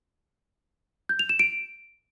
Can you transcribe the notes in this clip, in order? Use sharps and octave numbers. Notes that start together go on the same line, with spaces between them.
G6
F7
E7
D7